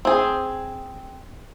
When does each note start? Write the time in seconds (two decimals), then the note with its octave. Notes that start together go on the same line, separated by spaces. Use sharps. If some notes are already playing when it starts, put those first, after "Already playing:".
0.05 C4 G#4